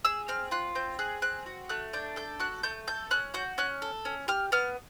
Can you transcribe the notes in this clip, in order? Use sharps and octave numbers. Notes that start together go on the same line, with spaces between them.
G#4 E6
C4 F6
F4 F#6
C4 G6
G#4 F#6
C4 F#6
F#4
A3 F#6
D4 G6
A4 G6
F#4 F#6
A3 G6
A4 G6
C#4 F#6
F#4 G6
C#4 F#6
A4
C#4
G4 F6
B3 F6